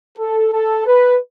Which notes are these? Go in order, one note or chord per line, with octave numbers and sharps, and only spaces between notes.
A4
A4
B4